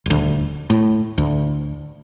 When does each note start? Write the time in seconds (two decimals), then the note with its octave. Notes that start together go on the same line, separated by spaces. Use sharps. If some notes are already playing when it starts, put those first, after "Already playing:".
0.06 D#1 D2
0.70 A2
1.18 D2